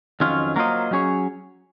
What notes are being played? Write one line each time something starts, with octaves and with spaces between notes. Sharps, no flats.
F2 D#3 F#3 C#4 F4
F#3 A#3 F4 C5 D#5
F#3 C#4 G#4 C#5